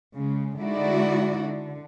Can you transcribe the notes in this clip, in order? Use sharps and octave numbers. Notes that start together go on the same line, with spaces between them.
C#3 G#3
D3 G#3 D#4 E4 F#4 D5
D3